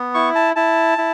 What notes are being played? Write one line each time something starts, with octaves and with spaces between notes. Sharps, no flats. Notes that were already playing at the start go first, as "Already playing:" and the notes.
Already playing: B3
E4 C#6
A5
E4 A5
E4